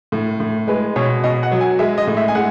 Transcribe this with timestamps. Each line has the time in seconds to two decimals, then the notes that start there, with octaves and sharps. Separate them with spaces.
0.12 A2
0.40 A2
0.68 G#3 B4
0.96 B2 C#5
1.24 B2 D#5
1.43 F#5
1.51 F#3
1.61 G#5
1.79 G#3 E5
1.98 D#5
2.07 A2
2.17 E5
2.28 G#5
2.35 G#3 F#5